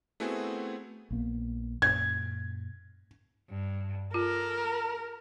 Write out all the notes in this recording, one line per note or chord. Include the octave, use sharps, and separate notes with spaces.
A3 B3 C4 E4 F#4 G#4
A#1 A#3 B3
F#2 A#2 G#6
G2
F4 A4 A#4